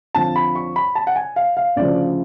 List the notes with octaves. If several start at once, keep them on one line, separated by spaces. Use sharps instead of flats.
F2 D3 F3 A5
B5
C#6
B5
A5
F#5
G#5
F5
F5
D2 C#3 F3 D5